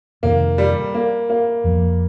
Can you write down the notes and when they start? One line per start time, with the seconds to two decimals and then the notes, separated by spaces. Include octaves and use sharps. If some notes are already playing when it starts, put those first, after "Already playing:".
0.23 F2 C3 D#3 A#3
0.58 G3
0.94 A#3
1.30 A#3
1.64 F2 F3 A#3